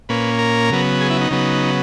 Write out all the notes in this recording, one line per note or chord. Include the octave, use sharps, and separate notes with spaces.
A#2 A#3 C#4 B4
A#4
C#3 F#3 B3
G#4
E4
D#4
C#3 F#3 B3